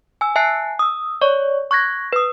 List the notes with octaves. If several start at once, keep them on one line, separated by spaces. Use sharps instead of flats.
G#5 E6
E5 G#5 A5 F#6 C7
D#6 E6
C#5 D5 C#6
C#6 F#6 G#6 A#6
B4 D#6